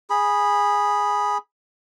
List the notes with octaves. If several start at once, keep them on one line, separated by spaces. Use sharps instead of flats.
G#4 B5